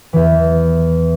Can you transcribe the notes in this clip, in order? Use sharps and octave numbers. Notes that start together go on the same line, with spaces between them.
E2 E3